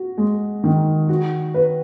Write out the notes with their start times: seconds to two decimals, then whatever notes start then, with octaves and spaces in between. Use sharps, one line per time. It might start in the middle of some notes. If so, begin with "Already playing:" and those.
Already playing: F#4
0.18 G#3
0.64 D#3
1.09 F#4
1.54 B4